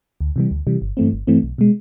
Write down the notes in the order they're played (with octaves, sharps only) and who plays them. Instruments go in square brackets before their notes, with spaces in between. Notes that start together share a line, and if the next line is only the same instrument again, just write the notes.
[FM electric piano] D2
C3 E3 G3
D2
C3 E3 G3
G1
G2 E3 A3 C4
G1
G2 E3 A3 C4
B1
B2 G#3